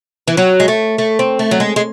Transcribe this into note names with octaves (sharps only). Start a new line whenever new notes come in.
E3
F#3
G#3
A3
A3
C4
A3
F#3
G#3
G#3